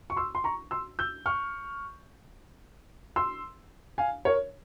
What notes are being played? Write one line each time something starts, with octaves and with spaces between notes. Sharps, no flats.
C#6
C6 E6
C6
A#5 C#6
C6 E6
E6 G6
C#6 F6
C6 E6
F5 G#5
A#4 C#5